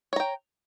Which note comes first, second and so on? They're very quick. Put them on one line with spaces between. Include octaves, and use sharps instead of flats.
C#5 A#5 G5